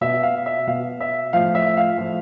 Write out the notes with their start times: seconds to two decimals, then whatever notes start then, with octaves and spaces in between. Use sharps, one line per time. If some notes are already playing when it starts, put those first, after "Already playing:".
0.01 B2 E5
0.23 F5
0.46 E5
0.67 B2 F5
1.01 E5
1.33 A2 F3 F5
1.55 E5
1.77 F5
1.98 A2 F3